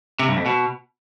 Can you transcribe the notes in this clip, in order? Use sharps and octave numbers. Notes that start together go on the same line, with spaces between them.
C3
G2
F2
B2